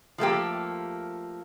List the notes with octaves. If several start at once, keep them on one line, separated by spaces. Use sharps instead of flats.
F3 A3 A#3 G4